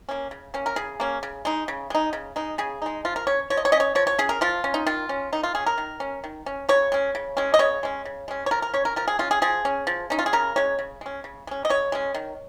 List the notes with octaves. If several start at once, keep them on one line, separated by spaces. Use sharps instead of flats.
A#3 C#4
C#3
A#3 C#4
A#4
C#3 G#4
A#3 C#4
C#3
G#3 D#4
C#3
G#3 D#4
C#3
G#3 D#4
C#3 G#4
G#3 D#4
F3 F4
A#4
C#4 C#5
F3 C#5
D#5
C#5
C#4 D#5
C#5
F3 C#5
C#5
C#4 G#4
A#4
F3 F4
C#4
D#4
D#3 F4
C#4
D#3 D#4
F4
C#4 G#4
A#4
D#3
C#4
D#3
C#4
C#3 C#5
G#3 C#4
C#3
G#3 C#4
D#5
C#3 C#5
G#3 C#4
C#3
G#3 C#4
C#5
F3 A#4
A#4
C#4 C#5
A#4
F3 A#4
G#4
C#4 F4
G#4
F3 G#4
C#4
F3
C#4 D#4
F4
G#4
C#3 A#4
G#3 C#4 C#5
C#3
G#3 C#4
C#3
G#3 C#4
D#5
C#3 C#5
G#3 C#4
D#3